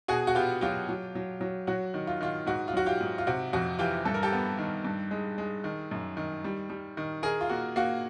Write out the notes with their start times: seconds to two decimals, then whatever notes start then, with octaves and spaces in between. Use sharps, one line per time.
0.08 B2 F#4 G#4
0.27 F#4
0.35 B3 F4 G4
0.61 F#3 F4 G4
0.89 F#3
1.15 F#3
1.41 F#3
1.67 F#3 F#4
1.94 D#3
2.07 F4
2.21 D#3 F4
2.46 G#2 F#4
2.68 F4
2.73 F#3 F#4
2.86 F4 G4
3.01 G#2
3.18 F4
3.27 C3 F#4
3.53 F2 F#4
3.79 E3 F4 G4
4.05 G2 A4
4.14 A#4
4.23 G4 A4
4.32 B3
4.58 D#3
4.85 G2
5.11 G#3
5.38 G#3
5.64 D#3
5.91 F#2
6.17 D#3
6.44 G3
6.70 G3
6.97 D#3
7.23 D#3 G#4 A#4
7.41 F4
7.49 A#3 F#4
7.76 A#3 F#4